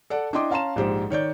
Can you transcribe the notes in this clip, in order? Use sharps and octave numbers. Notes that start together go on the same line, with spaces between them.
A4 D5 F#5
D4 E4 D#5 G5 C6 D6
C#4 F5 A5 A#5 C6 E7
A#1 G#2 G4 C5
D#3 C#5 D5 G6